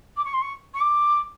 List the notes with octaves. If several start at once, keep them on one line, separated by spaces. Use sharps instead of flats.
D6
C#6
C6
C#6
C#6
D6